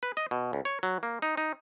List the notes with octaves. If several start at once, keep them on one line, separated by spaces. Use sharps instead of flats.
B4
D#5
B2
C#2
C#5
F#3
A#3
D#4
D#4